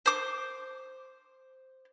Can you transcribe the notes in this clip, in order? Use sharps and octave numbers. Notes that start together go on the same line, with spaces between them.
C5 D6